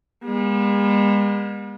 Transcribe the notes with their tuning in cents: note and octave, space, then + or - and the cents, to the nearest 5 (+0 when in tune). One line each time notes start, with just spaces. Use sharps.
G#3 -45 B3 -45